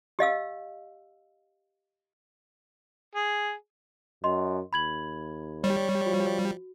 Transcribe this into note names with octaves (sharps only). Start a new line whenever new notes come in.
G4 D#5 F5 E6
G#4
F#2 D#5 C6
D#2 B5 G#6 F#7
G3 C#5
F3 F#4